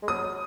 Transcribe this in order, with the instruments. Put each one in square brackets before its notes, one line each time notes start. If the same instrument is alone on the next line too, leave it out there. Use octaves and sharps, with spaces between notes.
[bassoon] G#3
[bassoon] F#3 [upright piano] D#6
[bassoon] F#3